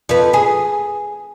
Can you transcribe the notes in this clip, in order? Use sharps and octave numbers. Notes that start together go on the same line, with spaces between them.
F2 B4
G#4